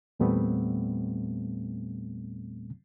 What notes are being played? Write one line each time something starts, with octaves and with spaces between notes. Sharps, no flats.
E2 A#2 G3 A3 B3 C4